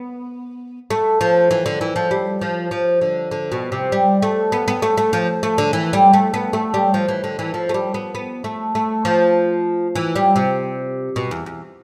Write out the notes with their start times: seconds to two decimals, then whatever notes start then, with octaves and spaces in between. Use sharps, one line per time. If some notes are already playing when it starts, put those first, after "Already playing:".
Already playing: B3
0.90 A3
1.21 F3
1.51 E3
1.66 D3
1.81 E3
1.96 F3
2.11 G3
2.41 F3
2.71 F3
3.01 D3
3.31 D3
3.52 B2
3.72 C3
3.92 G3
4.22 A3
4.52 B3
4.68 B3
4.82 A3
4.98 A3
5.13 F3
5.43 A3
5.58 D3
5.73 E3
5.93 G3
6.13 A3
6.34 B3
6.53 A3
6.74 G3
6.94 F3
7.09 E3
7.24 D3
7.39 E3
7.54 F3
7.69 A3
7.74 G3
7.94 B3
8.15 B3
8.44 A3
8.75 A3
9.05 F3
9.96 E3
10.16 G3
10.36 C3
11.16 B2
11.31 E2
11.46 E2